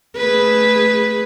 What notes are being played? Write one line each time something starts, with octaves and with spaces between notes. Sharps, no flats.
A3 G#4 B4